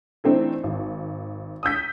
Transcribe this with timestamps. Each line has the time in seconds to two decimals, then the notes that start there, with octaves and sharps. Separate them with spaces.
0.24 E3 A3 C4 D4 D#4
0.64 G#1
1.63 D#6 E6 G6 B6